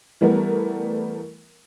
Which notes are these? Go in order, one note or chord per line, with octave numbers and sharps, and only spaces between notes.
E3 G3 A3 B3 A#4